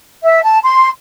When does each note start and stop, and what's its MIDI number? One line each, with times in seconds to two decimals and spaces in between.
0.23 0.43 76
0.43 0.59 81
0.63 0.88 84